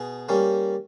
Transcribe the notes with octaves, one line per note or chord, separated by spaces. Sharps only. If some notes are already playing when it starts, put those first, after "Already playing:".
Already playing: B2 G#4
G3 A#3 C#4